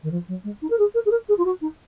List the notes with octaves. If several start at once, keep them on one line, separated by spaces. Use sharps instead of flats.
D#3
F3
F#3
G#3
D#4
A#4
G#4
A#4
G#4
A#4
G#4
F4
F#4
D#4